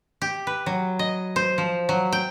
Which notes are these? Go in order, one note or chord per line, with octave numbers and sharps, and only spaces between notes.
G4
B4
F#3
D#5
C5
F3
F#3
G5